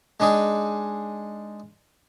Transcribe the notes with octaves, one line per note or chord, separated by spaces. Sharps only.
G#3 D4 D#4 G#4